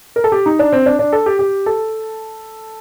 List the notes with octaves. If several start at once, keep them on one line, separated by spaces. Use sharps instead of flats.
A#4
A4
G4
D#4
D4
C4
D4
D4
A4
G4
G4
A4